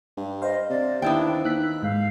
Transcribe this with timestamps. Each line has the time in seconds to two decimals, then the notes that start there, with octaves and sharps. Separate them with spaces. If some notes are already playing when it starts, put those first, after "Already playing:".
0.17 G2
0.42 C5 D#5 F5
0.70 C3 D5
1.02 D#2 B3 D4 E4 G5
1.45 D#2 D#4 E6 F#6 B6
1.83 G#2 F5